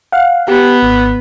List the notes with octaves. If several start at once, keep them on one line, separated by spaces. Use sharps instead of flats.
F5 F#5
B3 G4
G#1